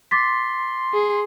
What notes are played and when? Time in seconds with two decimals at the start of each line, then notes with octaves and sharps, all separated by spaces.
0.11 C6 D6 A6 B6
0.93 G#4